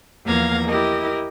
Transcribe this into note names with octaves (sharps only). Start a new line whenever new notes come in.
E2 F3 A#3 F5 A#5 G#6
E4 G4 A#4 D#5